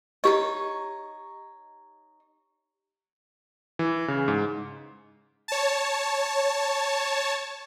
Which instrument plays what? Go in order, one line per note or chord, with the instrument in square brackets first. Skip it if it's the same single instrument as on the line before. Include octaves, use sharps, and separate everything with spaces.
[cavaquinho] D#4 E4 C#5 [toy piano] G4 D#5
[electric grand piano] E3
C#3
G#2
[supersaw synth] C#5 A5